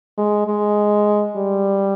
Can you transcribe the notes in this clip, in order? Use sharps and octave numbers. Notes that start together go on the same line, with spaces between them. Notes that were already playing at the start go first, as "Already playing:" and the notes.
G#3
G#3
G3